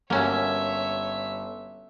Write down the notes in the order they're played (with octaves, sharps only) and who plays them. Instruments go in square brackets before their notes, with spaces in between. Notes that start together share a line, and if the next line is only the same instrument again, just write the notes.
[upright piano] G1 [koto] A#3 C#4 F#4 [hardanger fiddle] C#5 E5